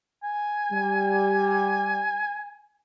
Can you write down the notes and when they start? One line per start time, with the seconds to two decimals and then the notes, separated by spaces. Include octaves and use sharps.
0.23 G#5
0.72 G3